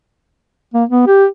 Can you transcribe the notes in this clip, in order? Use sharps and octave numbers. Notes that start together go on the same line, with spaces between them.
A#3
B3
G4